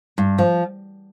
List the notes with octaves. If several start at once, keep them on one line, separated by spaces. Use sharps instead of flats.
G2
F3